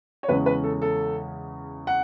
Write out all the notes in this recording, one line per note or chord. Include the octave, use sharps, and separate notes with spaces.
C#5
E2 C#3 G#3 C#4 B4
B4
A4
A4
F#5